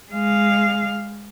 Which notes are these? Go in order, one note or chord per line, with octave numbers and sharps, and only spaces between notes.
G#3 F5